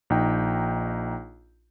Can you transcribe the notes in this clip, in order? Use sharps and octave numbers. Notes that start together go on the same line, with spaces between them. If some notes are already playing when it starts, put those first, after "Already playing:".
A#1 D#4 G5